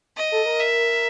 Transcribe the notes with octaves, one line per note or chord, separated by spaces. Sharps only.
D#5
A4
A#4
E5